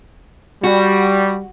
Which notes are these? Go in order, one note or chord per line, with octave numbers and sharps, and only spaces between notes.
G3 F#4